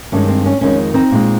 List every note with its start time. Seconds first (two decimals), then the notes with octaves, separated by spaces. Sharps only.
0.12 G2 D#3 G#3 C#4
0.28 C4
0.46 C#4
0.61 F2 D#3 G#3 C#4
0.94 C4 D#4
1.12 A#2 G#3